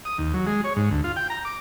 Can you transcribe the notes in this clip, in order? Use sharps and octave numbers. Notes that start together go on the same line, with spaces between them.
D#6
D#2
F#3
G#3
C#5
G#2
D2
F4
G5
A#5
D6